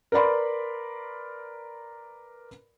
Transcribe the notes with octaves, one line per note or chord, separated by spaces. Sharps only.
A#4 B4 D5 B5 C6